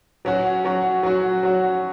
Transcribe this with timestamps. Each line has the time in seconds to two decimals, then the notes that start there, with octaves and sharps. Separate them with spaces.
0.25 F#3 C#4 F#4
0.65 F#3 C#4 F#4
1.03 F#3 C#4 F#4
1.43 F#3 C#4 F#4